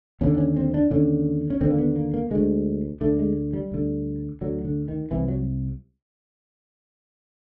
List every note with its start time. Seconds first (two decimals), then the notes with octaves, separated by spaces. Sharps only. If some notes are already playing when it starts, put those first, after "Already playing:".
0.21 D#2 D3 C#4
0.34 D4
0.38 C#4
0.57 C4
0.74 D4
0.90 D#2 D3 C#4
1.50 C#4
1.60 D#2 D3 C4
1.70 A#3
1.78 B3
1.96 A#3
2.14 A#3
2.31 D2 D3 G#3
3.01 D2 D3 A3
3.19 G#3
3.53 G3
3.71 D2 D3
4.41 D2 D3 F#3
4.65 D3
4.88 D#3
5.11 C2 C3 E3
5.28 F#3